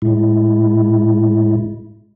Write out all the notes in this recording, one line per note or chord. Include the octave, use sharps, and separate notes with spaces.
A2 G#3 E4